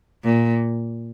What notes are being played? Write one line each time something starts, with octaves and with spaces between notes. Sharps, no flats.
A#2